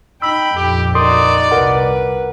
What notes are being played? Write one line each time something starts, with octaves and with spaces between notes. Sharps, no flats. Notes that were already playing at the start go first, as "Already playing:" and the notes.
D#4 G5 B5 E6
A#1 F2 G4
D#4 F#4 A#4 D5 C6 D#6
C2 A#4 B4 F#5